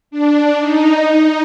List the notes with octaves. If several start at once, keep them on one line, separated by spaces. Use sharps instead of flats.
D4
D#4
D#4